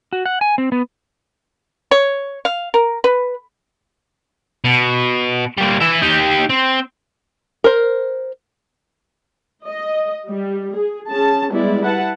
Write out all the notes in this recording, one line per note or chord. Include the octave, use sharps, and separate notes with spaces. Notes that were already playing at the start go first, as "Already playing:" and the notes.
F#4
F#5
G#5
C4
B3
C#5
F5
A#4
B4
B2
G3 A#3
E3 E5
D#4 G4
C4
A#4 C5
D#5
G3
G#4
C#4 G#4 A5
G3 G#3 B3 E4 D5
E4 B4 F#5 A5